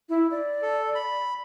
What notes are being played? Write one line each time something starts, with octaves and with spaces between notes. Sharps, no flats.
E4
D5
A4
B5